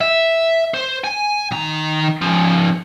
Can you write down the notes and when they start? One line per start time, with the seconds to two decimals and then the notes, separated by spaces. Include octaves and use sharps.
0.01 E5
0.74 C5
1.04 G#5
1.51 D#3 A#5
2.22 C#3 F3